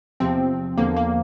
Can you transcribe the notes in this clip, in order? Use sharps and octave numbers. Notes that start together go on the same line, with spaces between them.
E2 C3 F3 C4
E2 D3 F3 A#3
A#3